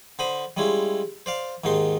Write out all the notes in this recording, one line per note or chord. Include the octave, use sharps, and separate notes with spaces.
D3 C5 B5 D#6
G3 G#3 C#4 E4 F4
C5 D5 F5
D#2 G#2 D#3 D#4 C6